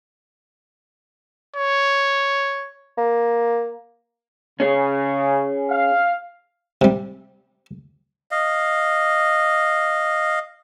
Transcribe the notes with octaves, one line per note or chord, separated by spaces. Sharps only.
C#5
A#3
C#3 C#4 G#4
F5
C3 G3
D#5 F5